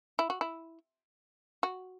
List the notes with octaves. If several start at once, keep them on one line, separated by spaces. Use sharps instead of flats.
E4
F#4
E4
F#4